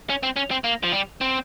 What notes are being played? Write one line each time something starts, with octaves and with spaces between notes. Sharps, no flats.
C#4
C4
C#4
C4
A#3
F3
G3
C4